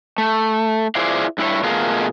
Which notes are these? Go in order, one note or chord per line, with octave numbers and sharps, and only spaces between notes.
A3
E4 F4 G#4 C5 D5 F5
G2 E4 G4 C#5
B2 A3 F4 G#4 A#4 F5